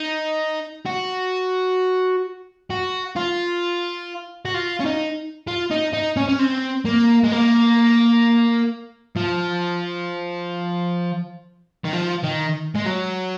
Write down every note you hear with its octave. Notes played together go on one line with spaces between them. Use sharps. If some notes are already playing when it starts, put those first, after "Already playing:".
Already playing: D#4
F#4
F#4
F4
F#4
F4
C#4
D#4
F4
D#4
D#4
C#4
C#4
C4
A#3
G#3
A#3
F3
D#3
F3
D#3
G#3
F#3